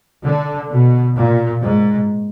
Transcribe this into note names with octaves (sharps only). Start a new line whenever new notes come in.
D3
B2
A#2
G#2